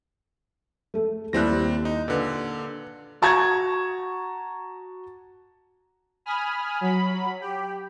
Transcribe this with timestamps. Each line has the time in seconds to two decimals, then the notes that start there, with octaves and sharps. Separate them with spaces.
0.94 A3 A4
1.33 D#2 G3 C4 E4 F#6 A#6
1.85 D#4
2.08 A#2 D3 B4
3.22 F#4 A5 A#5 C#6 G#6
6.26 G#5 B5 D#6 F6
6.81 F#3 B5
7.41 G4